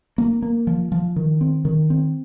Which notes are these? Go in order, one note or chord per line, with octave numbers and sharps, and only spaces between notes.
A#3
A#3
F3
F3
D#3
C4
D#3
C4